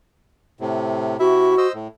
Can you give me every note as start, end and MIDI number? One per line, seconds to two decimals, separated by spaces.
0.60 1.17 45
0.60 1.17 48
1.20 1.55 48
1.20 1.55 64
1.20 1.67 66
1.20 1.55 76
1.58 1.72 72
1.58 1.72 75
1.58 1.72 88
1.74 1.88 45